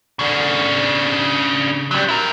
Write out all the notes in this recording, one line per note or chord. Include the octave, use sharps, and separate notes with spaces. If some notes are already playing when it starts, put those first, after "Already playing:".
C#3 D4
F#3 G3
E4 A#4